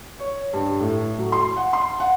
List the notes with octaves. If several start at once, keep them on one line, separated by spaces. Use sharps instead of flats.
C#5
G2
A2
F#3
C6
F#5
C6
F#5